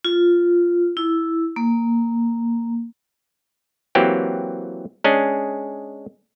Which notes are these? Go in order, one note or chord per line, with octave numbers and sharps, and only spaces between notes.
F4
E4
A#3
E3 F#3 A#3 C4 G4
G#3 C#4 D4 G#4